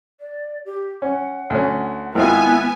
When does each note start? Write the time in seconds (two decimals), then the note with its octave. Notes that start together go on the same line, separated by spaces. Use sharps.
0.20 D5
0.65 G4
1.02 C#4 F#5
1.50 D2 C#4
2.15 G#1 B3 E4 F4 G#5